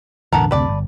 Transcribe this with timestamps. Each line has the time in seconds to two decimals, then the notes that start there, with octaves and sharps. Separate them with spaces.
0.33 E1 A1 D3 B3 A4 A#4
0.51 F#1 D2 C3 B4 D5 A5
0.68 G1